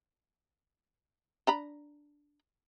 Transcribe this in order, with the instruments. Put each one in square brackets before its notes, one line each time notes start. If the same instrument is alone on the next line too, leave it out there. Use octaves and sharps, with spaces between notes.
[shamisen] D4 A#5 B5